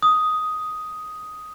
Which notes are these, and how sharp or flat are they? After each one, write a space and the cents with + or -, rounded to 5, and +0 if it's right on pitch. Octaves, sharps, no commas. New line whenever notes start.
D#6 +5